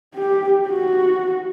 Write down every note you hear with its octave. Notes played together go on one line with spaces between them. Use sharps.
G4
F#4